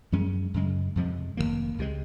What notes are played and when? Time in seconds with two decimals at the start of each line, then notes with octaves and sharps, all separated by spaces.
0.12 F#2 F3 G#3 C#4
0.54 F#2 C#3 G#3
0.96 F2 C3 F3 G#3
1.37 F1 F2 D#3 A#3
1.78 C#2 C3 F3 G#3